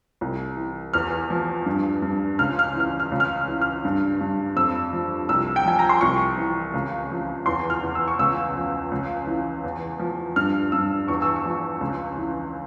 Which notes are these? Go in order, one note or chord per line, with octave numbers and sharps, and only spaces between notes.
C2
E3
E2 F6
F3
G2
G2
C#2 F6
F6
E3
F6
F6
C#2
F6
F6
E3
F6
G2
G2
F2 E6
F3
C2 E6
G5
F3 G#5
A#5
C6
C2 C#6
E3
C#2
F3
E2 C6
F6
E2
E6
C#6
C#2 E6
F3
C#2
E3
E2
F3
G2 F6
G2 E6
E2 C#6
E6
C#6
F3
C#2
E3